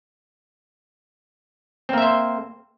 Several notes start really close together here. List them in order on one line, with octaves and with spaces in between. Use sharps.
C4 A#3 E5 C5